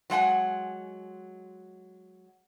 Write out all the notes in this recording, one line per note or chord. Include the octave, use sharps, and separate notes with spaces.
F#3 G#3 F#5 G#5